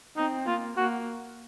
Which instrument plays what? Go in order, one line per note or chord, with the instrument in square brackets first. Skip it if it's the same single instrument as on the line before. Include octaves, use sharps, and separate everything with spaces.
[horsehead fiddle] C4 [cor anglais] D#4
[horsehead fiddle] A#3 [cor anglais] F4
[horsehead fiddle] A#3 [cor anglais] F#4